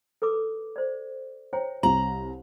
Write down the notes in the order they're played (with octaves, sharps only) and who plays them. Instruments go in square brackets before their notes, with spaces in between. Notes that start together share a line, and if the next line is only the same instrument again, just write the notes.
[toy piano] A4 B4 D6
C5 D5
[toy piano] C5 C#5 G5 [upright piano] A#5
[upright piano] C2 F#7 [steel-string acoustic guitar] A#5